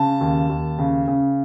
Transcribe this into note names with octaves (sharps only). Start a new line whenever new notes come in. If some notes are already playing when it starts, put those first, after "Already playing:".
Already playing: C#3 A5
D#2
D#2
C#3
C#3